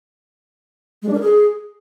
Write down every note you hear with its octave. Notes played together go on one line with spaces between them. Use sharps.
G#3
D4
A#4
G#4